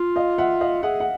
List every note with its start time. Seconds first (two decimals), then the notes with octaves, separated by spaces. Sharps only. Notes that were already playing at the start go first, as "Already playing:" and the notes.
Already playing: F4
0.16 D#5 F5
0.38 E5 F#5
0.61 D#5 F5
0.83 G#4 E5 F#5
1.00 F#5